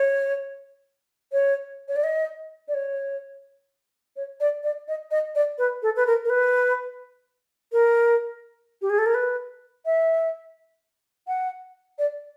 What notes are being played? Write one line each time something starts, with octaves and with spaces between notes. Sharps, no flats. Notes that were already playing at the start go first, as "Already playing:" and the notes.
Already playing: C#5
C#5
C#5
D5
D#5
D5
C#5
C#5
D5
D5
D#5
D#5
D5
B4
A4
B4
A#4
A#4
B4
A#4
G4
G#4
A4
A#4
B4
E5
F#5
D5